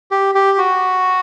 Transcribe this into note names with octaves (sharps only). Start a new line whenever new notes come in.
G4
G4
F#4